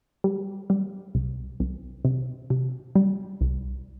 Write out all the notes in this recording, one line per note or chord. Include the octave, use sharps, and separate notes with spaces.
G3
G3
C2
C2
C3
C3
G3
C2